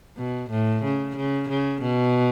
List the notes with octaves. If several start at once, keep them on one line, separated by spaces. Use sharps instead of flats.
B2
A2
C#3
C#3
C#3
B2